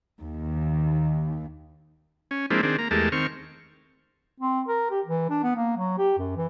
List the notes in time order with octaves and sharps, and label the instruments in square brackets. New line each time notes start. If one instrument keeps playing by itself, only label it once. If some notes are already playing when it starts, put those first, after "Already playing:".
[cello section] D#2
[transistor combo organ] C#4
F3 G#3 A#3 C4 D4 E4
D#3 C4 D4 G#4
A#3 A#5
E2 G#3 A3 G4 A#4 A5
D#3 C4 C#6 F6
[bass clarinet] C4
A#4
G4
E3
D4
B3
A#3
F#3
G4
F#2
E3